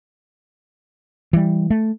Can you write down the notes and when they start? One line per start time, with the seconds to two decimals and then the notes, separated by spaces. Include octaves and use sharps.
1.33 E3 G3
1.70 A3